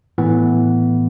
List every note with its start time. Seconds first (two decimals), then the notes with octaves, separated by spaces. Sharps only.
0.18 A2 E3 B3